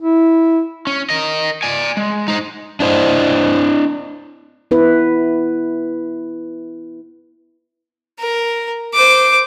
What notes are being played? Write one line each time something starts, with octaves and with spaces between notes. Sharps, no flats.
E4
C#4
A#4 D#5
D5 G#5
G#3
D#4 C5
D4 E4 C5 D#5
B3 E4 B4
A#4
C5 D6